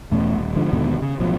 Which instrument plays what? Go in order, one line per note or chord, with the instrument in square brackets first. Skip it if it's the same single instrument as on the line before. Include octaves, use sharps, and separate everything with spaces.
[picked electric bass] E2 B2 A3 C#4
D#1
G#2 D3 F3
D#2 G#2 B2 D3
C#3
A1 B2 F3 F#3